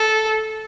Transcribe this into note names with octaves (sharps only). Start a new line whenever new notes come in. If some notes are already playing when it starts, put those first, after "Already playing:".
Already playing: A4